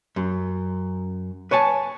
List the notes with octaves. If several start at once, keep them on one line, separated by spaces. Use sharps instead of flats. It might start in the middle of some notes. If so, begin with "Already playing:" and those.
F#2
B4 C#5 G#5 A5